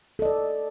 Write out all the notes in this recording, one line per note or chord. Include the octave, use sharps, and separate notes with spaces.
A4 D5 D#5